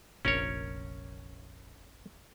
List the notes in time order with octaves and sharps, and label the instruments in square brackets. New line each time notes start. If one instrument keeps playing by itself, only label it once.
[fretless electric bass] F1 A#1 [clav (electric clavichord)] C#4 A#4 C#5